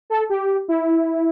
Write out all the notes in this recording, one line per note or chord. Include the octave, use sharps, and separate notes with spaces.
A4
G4
E4